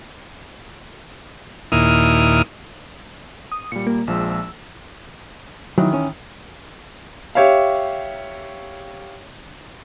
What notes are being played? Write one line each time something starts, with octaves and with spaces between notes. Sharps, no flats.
D#2 A#2 E4 D#6 F6
D#6
A#2 G3 C#7
A#3
A#1 F3 G#3 E6
D#3 E3 F#3
C#4
G4 C#5 E5 F5